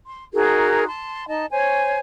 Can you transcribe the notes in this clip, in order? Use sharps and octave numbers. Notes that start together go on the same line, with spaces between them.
C6
D#4 F#4 G#4 A#4
A5 C6
D#4 D#5 A5
C5 C#5 G#5